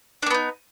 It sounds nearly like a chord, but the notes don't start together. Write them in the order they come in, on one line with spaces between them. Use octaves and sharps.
D4 A#3 B3 D#4